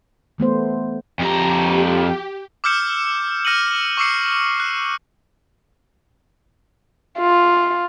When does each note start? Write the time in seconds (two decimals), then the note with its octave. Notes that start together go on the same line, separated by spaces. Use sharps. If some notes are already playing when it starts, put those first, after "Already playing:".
0.38 E3 A3 B3 C5
1.19 F2 G4 A#5
2.64 D6 E6 F6 G6 C#7 E7
3.45 F6 A#6 C#7 D#7 F#7
3.97 C#6 D6 E6 C7 C#7
4.60 F#6
7.19 F4